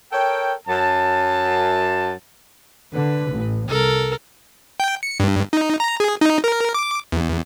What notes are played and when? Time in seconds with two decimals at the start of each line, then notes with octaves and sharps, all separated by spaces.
0.12 A4 A#4 C#5 G5
0.68 F#2 A5
2.93 D3 B4
3.32 A1
3.68 C2 A4 A#4
4.80 G5
5.03 C#7
5.20 G2
5.53 D#4
5.80 A#5
6.00 G#4
6.21 D#4
6.44 A#4
6.74 D6
7.12 E2